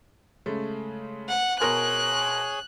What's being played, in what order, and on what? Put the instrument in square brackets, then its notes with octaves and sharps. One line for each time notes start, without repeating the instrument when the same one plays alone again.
[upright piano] C#3 G#3 A3
[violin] F#5
[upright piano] B2 A#4 C6 [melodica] G#4 C#5 G#5 [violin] F#6